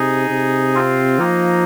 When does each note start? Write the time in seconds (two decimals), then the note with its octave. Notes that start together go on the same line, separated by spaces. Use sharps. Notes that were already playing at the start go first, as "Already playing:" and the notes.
Already playing: C3 D#4 G#4
0.30 C3
0.75 C4 F4
1.19 F3 A#3 D#4